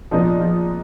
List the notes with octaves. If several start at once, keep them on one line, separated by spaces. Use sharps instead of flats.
A#2 F3 G#3 B3 D#4
F3